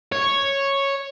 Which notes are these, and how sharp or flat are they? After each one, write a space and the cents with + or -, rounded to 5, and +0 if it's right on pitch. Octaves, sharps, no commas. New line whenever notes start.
C#5 -5